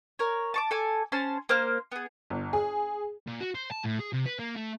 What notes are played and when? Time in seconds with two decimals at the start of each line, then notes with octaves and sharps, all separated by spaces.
0.19 A#4 C#5
0.54 A5 C#6 D6
0.71 A4 G#5 D6
1.12 C#4 C5 A5 C6
1.49 A#3 C5 D6 F6
1.92 B3 G#4
2.30 G1
2.53 G#4
3.27 A#2
3.41 F#4
3.55 C5
3.71 A5
3.84 A2
3.99 G#4
4.13 C3
4.26 B4
4.39 A#3
4.56 A3